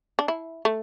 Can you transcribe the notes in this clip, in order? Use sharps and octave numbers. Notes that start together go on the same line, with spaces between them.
D4
E4
A3